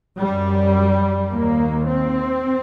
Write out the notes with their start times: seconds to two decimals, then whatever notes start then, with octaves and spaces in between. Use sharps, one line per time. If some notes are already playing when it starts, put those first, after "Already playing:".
0.18 F#2 G3
1.31 D#2 A#3
1.88 C4